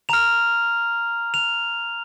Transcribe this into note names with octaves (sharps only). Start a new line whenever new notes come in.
A#5 F6 F7
F7